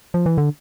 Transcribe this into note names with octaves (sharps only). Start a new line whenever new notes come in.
F3
E3
D3